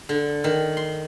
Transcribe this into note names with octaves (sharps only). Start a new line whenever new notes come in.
D3
D#3
C6